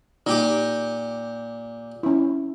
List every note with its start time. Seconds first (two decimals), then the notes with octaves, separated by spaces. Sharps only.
0.26 A#2 D#4 G4 D6
2.03 C#4 E4